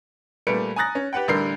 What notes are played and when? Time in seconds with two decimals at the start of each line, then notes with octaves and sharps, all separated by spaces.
0.47 A#2 G3 A3 B4 C#7 D7
0.76 G#5 A#5 D#6 F#6 A6 A#6
0.95 C#4
1.13 G4 B4 F#5 G5
1.28 A1 D3 G3 A#4 G6 C7